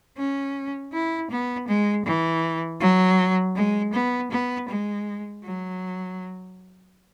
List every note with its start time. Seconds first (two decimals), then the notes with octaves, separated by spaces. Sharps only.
0.17 C#4
0.93 E4
1.30 B3
1.68 G#3
2.05 E3
2.81 F#3
3.55 G#3
3.93 B3
4.31 B3
4.68 G#3
5.44 F#3